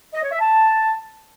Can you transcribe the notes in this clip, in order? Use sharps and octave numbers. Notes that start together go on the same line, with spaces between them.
D#5
C#5
E5
A5